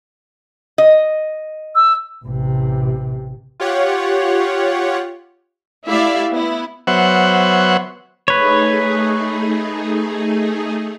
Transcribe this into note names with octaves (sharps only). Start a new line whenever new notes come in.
D#5
E6
A1 C3
F4 G4 C#5 F#5
A3 E4 G4 D5 E5 F5
B3 E4
F#3 B3 C5 C#5 E5 F#5
A3 D#4 G#4 B4 C#5